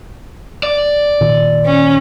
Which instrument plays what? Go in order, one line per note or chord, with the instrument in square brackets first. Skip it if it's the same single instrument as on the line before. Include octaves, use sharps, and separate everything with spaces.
[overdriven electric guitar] D5
[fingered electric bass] A#2 D#3
[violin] C#4